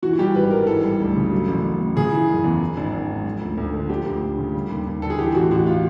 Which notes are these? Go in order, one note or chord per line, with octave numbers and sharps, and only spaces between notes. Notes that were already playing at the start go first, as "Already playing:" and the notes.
E3 F#4
F#4
G3 G4
G#1 B4
G2 A#4
E3 A4
G3
D2
C#3
F#3
A1
A1
A2
C#3 G#4
E3
F#1
E2
F3
G#1
G#1
G#2
F3
D2
D2
D3
F3 G4
D2
D2
C#3
G3
D#2
D#2
D3 A4
G#4
E3 G4
A1 F#4
A1 F#4
F4